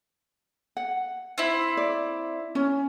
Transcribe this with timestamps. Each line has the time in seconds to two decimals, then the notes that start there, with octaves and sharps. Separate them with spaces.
0.77 F#5
1.38 C4 E4
1.77 D5
2.55 C#4